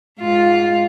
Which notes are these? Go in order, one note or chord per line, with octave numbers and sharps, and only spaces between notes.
G#2 F4